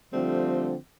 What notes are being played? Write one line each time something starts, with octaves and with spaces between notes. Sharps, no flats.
D3 F3 G3 A3 C4